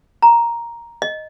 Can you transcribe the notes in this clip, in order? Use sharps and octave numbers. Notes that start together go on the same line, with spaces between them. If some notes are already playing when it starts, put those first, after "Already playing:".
A#5
D#5